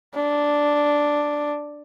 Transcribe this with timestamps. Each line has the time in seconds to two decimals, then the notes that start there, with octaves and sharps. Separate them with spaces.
0.15 D4